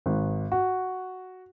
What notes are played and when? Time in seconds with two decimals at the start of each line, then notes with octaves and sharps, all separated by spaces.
0.06 G#1
0.52 F#4